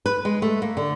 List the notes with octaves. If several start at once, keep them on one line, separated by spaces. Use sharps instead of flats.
B4
G#3
A3
A#3
D3